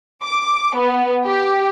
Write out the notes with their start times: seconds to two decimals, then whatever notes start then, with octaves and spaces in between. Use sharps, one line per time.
0.23 D6
0.76 B3
1.27 G4